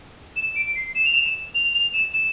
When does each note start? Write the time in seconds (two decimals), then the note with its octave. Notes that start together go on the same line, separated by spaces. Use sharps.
0.36 E7
0.56 D7
0.76 C7
0.95 E7
1.05 F7
1.14 E7
1.55 F7
1.74 F7
1.94 E7
2.14 E7